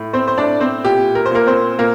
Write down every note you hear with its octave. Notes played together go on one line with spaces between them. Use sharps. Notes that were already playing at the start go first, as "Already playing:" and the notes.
Already playing: A2
C4 C5
C5
A2 D4 D5
C4 C5
A#2 G4
A#4
C5
A#2 A#3 A#4
C4 C5
A#2 A#3 A#4